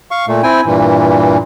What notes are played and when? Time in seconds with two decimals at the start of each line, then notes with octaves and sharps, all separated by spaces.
0.11 F5 C#6
0.28 A#2 A3
0.43 C4 E4 G5 G#5
0.66 G2 A#2 E3